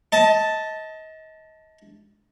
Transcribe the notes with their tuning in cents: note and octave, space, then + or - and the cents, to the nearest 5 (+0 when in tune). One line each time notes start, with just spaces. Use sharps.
D#5 +30 A5 +0